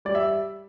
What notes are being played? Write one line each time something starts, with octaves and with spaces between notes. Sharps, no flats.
G3 D5
E5